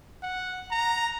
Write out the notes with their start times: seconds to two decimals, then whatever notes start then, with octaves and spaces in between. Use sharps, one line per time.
0.23 F#5
0.71 A#5